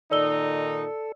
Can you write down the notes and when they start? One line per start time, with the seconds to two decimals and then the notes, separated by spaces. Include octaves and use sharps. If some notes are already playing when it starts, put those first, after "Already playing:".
0.11 A#2 D#3 D#4 A4 D5 E6 G7